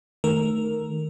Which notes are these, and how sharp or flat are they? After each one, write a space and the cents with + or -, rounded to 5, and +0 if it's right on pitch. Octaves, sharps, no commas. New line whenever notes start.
D#3 +0 A3 +0 A#4 +0